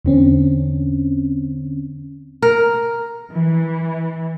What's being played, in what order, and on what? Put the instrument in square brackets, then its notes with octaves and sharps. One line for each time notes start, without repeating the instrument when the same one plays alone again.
[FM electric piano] E2 D3 C4 C#4
[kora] A#4
[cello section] E3